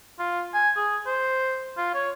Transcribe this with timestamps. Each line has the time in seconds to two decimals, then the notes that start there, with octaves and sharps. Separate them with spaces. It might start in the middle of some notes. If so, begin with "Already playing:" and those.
0.19 F4
0.54 G#5
0.76 G#4
1.06 C5
1.77 F4
1.94 C#5